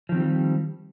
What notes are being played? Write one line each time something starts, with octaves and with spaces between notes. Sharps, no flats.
D#3 F3 G3 C4 G4